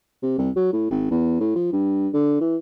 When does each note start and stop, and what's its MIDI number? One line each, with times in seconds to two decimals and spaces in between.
0.23 0.38 48
0.38 0.50 36
0.56 0.73 54
0.73 0.90 45
0.91 1.07 32
1.11 1.37 40
1.40 1.55 45
1.56 1.71 53
1.72 2.08 43
2.13 2.40 50
2.41 2.56 52